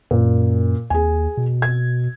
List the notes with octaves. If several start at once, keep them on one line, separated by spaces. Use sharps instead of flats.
F#2 A#2
D#2 G#4 G#5
B2
G#6